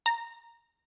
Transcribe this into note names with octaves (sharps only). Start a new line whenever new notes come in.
A#5